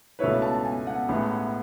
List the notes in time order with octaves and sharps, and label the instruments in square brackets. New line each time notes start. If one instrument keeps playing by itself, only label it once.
[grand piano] C#2 B2 A3 E4 B4 [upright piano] C#5
[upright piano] A5
A5
G#5
F#5
[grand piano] A1 A2 G#3 B3